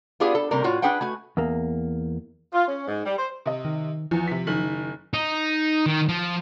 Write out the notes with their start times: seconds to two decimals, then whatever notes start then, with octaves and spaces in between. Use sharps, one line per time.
0.20 B3 D4 F4 G4 G#4
0.35 A4
0.51 C3 G3 A#3 A#4
0.64 A2 F4 F#4 C#5
0.82 D4 G#4 B4 F#5 G5
1.01 A3 F#4 G#5
1.37 E2 A#3
2.52 F4
2.68 C#4
2.87 G#2
3.06 G3
3.18 C5
3.46 C3 D#5
3.65 D#3
4.11 E2 F3
4.28 C3 B6
4.47 F#1 D#3 F#7
5.14 D#4
5.86 D#3
6.09 F3